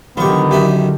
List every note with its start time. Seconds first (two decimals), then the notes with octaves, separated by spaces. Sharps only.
0.17 D3 D#3 F#3 B3 F4 G4 C#6
0.51 F#2 D#4 E4 G4